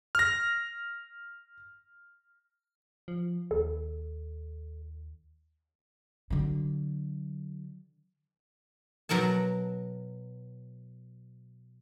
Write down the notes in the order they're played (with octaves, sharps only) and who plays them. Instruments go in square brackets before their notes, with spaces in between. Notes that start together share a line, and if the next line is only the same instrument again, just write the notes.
[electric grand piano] F6 A#6
[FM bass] F3
[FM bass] D#2 [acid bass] A4
[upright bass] D3 F#3
[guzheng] B2 F#3 A#4 F#5 A5